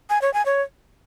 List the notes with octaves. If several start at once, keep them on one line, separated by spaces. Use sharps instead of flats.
G#5
C#5
G#5
C#5